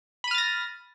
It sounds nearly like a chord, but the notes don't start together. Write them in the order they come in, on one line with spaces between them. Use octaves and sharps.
B5 D#7 F6 A6 A#6